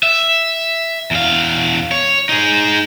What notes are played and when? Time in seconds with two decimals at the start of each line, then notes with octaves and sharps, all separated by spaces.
0.03 E5
1.11 E2 F5
1.92 C#5
2.29 D#4 G#4